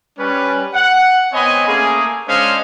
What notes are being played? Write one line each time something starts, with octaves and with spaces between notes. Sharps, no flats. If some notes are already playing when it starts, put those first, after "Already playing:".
G3 C#4 B4
F#5
B3 C4 C#5 D#5 G#5 B5
A3 A#3 C#4 G#4
G#3 C#4 D4 C5 D#5 F5